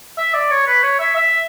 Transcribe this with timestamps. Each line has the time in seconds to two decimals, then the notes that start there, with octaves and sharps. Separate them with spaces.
0.18 E5
0.34 D5
0.50 C#5
0.67 B4
0.83 C#5
1.00 E5
1.16 E5